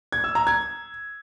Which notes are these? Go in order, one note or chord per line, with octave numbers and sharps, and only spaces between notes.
G#6
E6
A#5
G#6